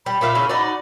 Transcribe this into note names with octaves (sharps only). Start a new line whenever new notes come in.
G3 B5
A#2 E5 F5
C#3 C#4 E4
D#4 F#4 D5